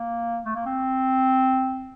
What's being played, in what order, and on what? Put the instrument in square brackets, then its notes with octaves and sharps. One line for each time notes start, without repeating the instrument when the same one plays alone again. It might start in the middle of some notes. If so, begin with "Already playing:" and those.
Already playing: [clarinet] A#3
A3
A#3
C4